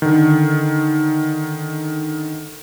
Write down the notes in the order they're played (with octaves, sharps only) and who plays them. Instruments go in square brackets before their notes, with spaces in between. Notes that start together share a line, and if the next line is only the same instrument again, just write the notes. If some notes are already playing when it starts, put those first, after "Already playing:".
[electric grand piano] D3 D#3